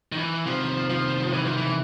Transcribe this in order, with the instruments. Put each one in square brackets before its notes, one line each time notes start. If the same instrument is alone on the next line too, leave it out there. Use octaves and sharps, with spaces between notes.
[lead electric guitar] D#3
E3
[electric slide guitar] C3 D#3 G3 C4 [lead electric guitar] F3
[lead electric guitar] F3
E3
F3
E3